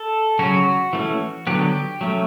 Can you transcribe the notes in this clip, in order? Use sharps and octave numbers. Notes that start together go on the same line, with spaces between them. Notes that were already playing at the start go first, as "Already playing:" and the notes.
Already playing: A4
C#3 F#3 C#4 F#4
E3 A3 C#4
D3 F#3 B3 G4
F#3 A3 C#4